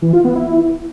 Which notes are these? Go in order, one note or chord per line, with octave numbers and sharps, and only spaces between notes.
E3
F4
B3
E4